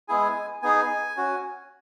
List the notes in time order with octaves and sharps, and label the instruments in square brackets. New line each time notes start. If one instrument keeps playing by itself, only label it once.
[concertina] G#3 B3 E4 G#4 G#5
B3 D#4 G#4 G#5
C#4 F#4